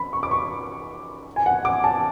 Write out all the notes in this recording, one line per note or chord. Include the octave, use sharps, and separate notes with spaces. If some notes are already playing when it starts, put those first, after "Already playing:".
Already playing: B5
C#6
D6
C#6
G#5
F#5
D6
A5